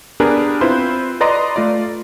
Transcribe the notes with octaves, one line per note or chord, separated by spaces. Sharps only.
B3 D4 G4 G#4 A#4 B4
C4 E4 F4 B4 C5
B4 D5 D#5 A#5 C6
A3 F4 D5